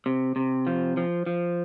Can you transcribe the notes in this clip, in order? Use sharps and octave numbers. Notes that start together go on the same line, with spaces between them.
C3
C3
F3
F3
F3